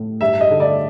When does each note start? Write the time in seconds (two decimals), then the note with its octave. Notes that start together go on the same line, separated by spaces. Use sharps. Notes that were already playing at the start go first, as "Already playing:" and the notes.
Already playing: A2
0.21 G2 E5
0.41 D#5
0.50 D3
0.60 D5